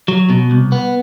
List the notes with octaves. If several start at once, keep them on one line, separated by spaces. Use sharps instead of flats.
F#3
B2
C2
B3